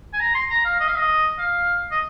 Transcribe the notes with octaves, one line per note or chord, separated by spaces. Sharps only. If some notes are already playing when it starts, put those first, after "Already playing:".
G#5
A#5
C6
A#5
F5
D#5
F5
D#5
F5
D#5